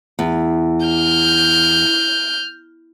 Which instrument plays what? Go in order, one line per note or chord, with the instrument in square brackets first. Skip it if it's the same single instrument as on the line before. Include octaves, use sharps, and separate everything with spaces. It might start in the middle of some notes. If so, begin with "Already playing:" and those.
[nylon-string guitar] E2
[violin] F6 G6